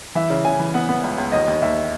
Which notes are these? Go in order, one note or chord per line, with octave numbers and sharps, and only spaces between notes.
E3 E5
C#3
C#3 G#5
E3
B3 F#5
B3
C#2
C#2
D#2 D#5
D#2
D#2 E5